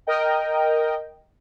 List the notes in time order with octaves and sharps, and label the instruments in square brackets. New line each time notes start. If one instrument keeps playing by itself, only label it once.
[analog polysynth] A#4 D#5 G5